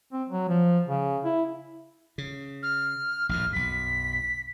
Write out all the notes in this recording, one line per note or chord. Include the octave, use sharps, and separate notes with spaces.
C4
F#3
F3
C#3
E4
C#3
F6
A#1 D#2 A2 F6
B1 F#2 B6